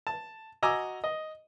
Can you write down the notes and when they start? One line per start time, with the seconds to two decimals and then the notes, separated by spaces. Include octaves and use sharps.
0.07 A5
0.62 F#4 D#5 G#5 A#5 D6 E6
1.04 D#5